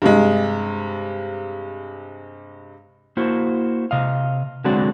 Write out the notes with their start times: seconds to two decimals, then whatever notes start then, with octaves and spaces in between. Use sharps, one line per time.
0.02 G2 C3 G#3
3.17 A#3 E4 F#4 C5
3.91 C3 D#5 F5
4.64 D3 F#3 G#3 C4 F#4 D5